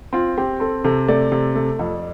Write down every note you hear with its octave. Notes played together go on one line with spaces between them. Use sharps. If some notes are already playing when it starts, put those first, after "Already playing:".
C4 F4
C4 G4
C4 A4
C3 A4
A3 D5
C3
A3
F2